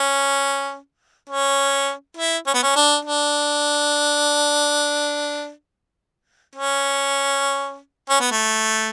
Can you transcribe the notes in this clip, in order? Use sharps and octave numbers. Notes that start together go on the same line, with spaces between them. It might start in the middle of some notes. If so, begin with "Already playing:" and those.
Already playing: C#4
C#4
E4
C#4
B3
C#4
D4
D4
C#4
C#4
B3
A3